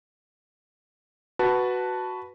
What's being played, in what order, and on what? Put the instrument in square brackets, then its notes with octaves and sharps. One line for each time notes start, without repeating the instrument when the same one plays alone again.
[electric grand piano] F#4 B4 A5